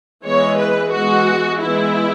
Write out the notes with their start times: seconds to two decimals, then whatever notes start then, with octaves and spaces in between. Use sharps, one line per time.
0.25 E3 G#3 B3 C#5
0.60 B4
0.93 E3 G#3 B3 F#4
1.63 E3 G#3 B3 E4